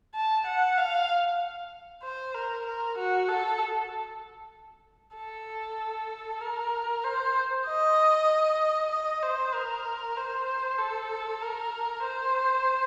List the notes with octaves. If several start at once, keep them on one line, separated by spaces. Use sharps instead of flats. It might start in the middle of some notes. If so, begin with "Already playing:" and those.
A5
F#5
F5
C5
A#4
A#4
F#4
A4
A4
A#4
C5
D#5
D#5
C5
A#4
C5
A4
A#4
C5